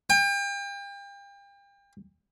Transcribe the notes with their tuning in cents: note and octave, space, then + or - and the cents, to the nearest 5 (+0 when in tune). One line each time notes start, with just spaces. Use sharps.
G5 +35